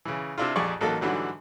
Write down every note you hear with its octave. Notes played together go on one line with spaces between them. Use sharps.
C#3 E3
C3 D4 E4 F4
A#1 F2 G4 G#4 D5 C#6
A1 F#3 A#3 D#4 A4
G#2 D3 E3 F#3 G3